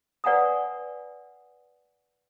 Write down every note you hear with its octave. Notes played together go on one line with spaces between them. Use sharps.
B4 D5 F#5 G#5 A#5 D#6